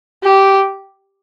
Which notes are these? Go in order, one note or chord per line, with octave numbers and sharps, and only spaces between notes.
G4